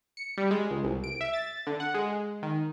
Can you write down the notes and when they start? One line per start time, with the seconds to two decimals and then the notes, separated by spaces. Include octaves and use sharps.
0.17 C#7
0.37 G3
0.51 G#3
0.71 C#2
0.84 C2
1.04 D7
1.21 E5
1.33 A6
1.67 D3
1.80 F#5
1.94 G#3
2.43 D#3